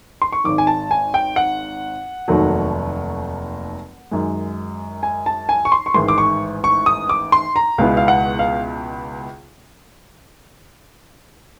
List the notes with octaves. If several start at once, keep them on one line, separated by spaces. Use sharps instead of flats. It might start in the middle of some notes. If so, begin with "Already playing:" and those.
C6
C#6
G#1 G#2 D#3 D6
G#5
A5
G#5
G5
F#5
F1 D#2 D#3 F#3 A3
F#2 D#3 G#3
G#5
A5
G#5
C#6
C6
C#6
A1 G#2 D#3 G#3 C6
D6
C#6
C#6
D#6
D6
C6
A#5
C#2 B2 G#3 B3 E4 F5
F5
F#5
F5